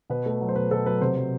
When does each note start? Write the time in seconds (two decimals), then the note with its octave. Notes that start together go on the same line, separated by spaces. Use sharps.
0.10 B2 B4
0.26 A3
0.41 F#3
0.49 C5
0.56 B2 B4
0.71 B2 A4
0.86 F#3 B4
1.01 C3 C5
1.16 F#3